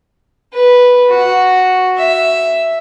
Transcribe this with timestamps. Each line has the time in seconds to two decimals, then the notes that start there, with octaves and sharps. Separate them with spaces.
0.54 B4
1.10 F#4
1.98 E5